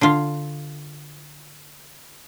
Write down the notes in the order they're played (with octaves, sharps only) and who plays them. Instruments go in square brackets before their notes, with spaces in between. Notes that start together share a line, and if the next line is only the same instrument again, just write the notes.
[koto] D3 F4